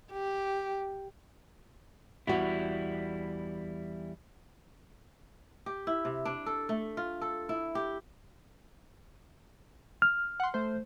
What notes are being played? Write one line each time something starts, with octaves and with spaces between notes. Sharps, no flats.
G4
E2 G3 B3 E4 F#4
G4
E4
C3
D4
A4
A3
F4
A4
E4
G4
F6
F#5 C6
A3 C5